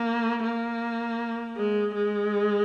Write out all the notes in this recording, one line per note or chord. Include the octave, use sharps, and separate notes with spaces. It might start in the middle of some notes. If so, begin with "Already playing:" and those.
Already playing: A#3
A#3
G#3
G#3